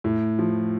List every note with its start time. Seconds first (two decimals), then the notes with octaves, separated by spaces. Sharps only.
0.04 A2
0.39 F3